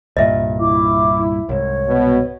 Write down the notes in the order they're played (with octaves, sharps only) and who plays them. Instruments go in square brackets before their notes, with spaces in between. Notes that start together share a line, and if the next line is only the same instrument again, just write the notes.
[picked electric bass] C2 G2 A#2 [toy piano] D#5 E5
[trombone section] E4 [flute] D6
[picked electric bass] C2 G#2 [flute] C#5
[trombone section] B2 B3